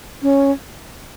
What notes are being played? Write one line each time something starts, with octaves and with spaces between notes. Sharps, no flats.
C#4